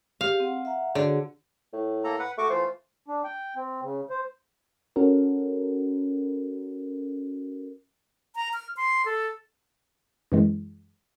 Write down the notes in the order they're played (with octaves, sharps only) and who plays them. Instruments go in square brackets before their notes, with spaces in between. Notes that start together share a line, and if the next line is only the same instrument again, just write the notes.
[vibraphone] G4 [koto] F5
[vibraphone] C4 F#5
E5 F#5 A#5
[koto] D3 [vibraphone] F#4 G#4
[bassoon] A2
[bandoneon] A#3 A4 A#5
B4 F#5
[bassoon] A3 [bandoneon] F#4 C#6 D6
[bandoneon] E3 A3 F4 [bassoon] C5
[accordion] D4
G5
C4
C#3
C5
[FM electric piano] C#4 F#4 A4 A#4
[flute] A#5
F6
C6
A4
[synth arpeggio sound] F#2 E3 G#3